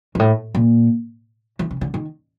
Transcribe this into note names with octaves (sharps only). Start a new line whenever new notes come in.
G#2
A2
A#2
E3
C#3
D3
D#3